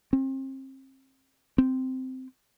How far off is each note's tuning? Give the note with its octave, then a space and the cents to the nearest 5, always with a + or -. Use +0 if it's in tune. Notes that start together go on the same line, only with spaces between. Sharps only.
C4 +35
C4 -10